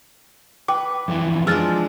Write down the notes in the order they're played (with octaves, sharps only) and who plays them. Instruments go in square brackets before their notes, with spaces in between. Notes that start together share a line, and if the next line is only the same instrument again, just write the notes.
[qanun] B4 [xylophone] G5 D6
[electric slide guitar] F2 E3
[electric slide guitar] F3 [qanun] G#3 D4 D5 [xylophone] E6 F6 A6